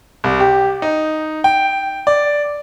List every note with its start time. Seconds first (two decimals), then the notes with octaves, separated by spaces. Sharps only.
0.24 C2
0.40 G4
0.82 D#4
1.44 G5
2.07 D5